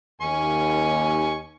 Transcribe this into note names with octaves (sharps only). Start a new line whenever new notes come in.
D#2 G#5 C#6